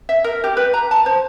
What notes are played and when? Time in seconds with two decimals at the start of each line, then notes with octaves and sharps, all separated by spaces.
0.09 E5
0.24 A#4
0.44 G4
0.57 B4
0.74 A#5
0.91 A5
1.06 C5